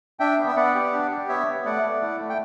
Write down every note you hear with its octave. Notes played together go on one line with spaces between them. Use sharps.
D4 E5 G5
B3
E5
B3 D5 F#5
G4
D4
G4
B3 C#5 E5
B3
A3 D5 F#5
A3
E4
A3
G5